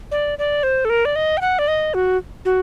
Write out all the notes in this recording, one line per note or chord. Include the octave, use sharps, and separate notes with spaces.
D5
D5
C5
A4
A#4
D5
D#5
G5
F#5
D5
D#5
F#4
F#4